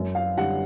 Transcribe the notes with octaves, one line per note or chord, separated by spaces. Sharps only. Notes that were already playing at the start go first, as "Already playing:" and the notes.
Already playing: F#2
F5
D3 G3 F#5